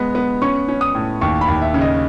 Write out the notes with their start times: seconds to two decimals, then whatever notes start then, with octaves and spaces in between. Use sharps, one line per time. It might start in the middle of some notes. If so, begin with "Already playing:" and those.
Already playing: G#3 B3
0.15 B3
0.42 C#4 C#6
0.69 C#4
0.81 D#6
0.95 A2
1.21 D#2 C#6
1.41 B5
1.48 D#2
1.62 E5
1.74 C#3
1.81 D#5